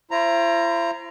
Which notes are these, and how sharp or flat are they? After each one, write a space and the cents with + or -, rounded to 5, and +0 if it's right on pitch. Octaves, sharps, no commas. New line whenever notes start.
E4 +45 C5 +25 A#5 +0